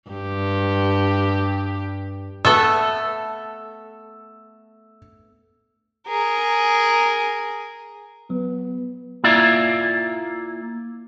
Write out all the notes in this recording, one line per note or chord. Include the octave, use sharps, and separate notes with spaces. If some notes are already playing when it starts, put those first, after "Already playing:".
G2 G4
A3 B3 A4 E6
G#4 A#4
F#3 B3
A#3 E4 F4 D5 E5